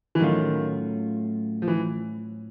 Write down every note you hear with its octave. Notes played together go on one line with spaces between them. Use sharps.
E3
A2 D#3 F#3 A3 C#4 F4
F3
E3